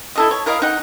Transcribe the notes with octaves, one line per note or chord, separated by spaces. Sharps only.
E4 A4 D#5
C#5
E4 A#4 D#5 F5
D#4 F#5